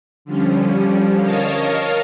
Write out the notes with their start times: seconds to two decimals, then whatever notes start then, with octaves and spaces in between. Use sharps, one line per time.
0.25 D3 F3 G3 C#4
1.23 A#4 C#5 D#5 F5 A5 A#5